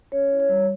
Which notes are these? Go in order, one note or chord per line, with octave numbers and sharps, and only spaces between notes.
C#4 C#5
E4
C#5
G3